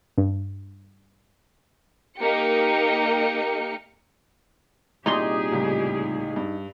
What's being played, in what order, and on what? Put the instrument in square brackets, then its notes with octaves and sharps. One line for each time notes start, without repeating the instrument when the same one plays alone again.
[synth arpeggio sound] G2
[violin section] A#3 D#4 G4 C#7
[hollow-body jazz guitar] C2 A#2 C6 [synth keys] D#4 [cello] G4 G#4
[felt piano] C#2 A2 G3
G2